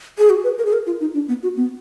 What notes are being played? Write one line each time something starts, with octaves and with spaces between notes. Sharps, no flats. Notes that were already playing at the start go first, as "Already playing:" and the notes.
G#4
F#4
B4
A#4
G#4
A#4
F4
D#4
D4
B3
F#4
B3